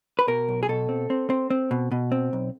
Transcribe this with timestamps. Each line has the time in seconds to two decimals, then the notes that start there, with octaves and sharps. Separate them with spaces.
0.19 B4
0.28 B2 A#4
0.48 B1
0.63 G#4
0.69 B2 A4
0.89 C4
1.10 C4
1.30 C4
1.50 C4
1.71 B2
1.92 B2
2.12 C4
2.33 B1